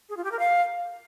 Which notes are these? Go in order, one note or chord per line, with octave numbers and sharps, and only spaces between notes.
G#4
F4
G4
A#4
F5